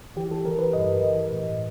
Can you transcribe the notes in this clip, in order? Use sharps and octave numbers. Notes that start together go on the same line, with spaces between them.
E3 G4
A4
E3 A#4
B4
G2 D#5
E3
A2